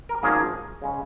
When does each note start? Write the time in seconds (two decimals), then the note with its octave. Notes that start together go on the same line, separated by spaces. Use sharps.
0.09 A#4
0.23 G#1 G#2 F3 A#3 C#4 G#4
0.82 C#3 G#3 C#4